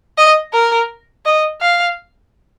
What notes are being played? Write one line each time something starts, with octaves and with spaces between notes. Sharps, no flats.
D#5
A#4
D#5
F5